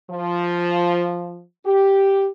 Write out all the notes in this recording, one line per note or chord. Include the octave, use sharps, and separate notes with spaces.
F3
G4